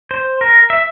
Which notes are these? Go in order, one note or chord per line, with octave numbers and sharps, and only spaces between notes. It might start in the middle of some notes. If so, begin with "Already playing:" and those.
C5
A#4
E5